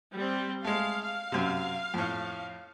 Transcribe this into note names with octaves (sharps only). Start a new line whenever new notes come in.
G3 C4
G#3 A3 F5
F5
F#2 C3
F2 A2